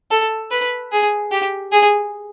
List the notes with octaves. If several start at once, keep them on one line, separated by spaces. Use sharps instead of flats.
A4
B4
G#4
G4
G#4